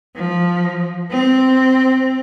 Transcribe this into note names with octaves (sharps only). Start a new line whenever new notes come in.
F3
C4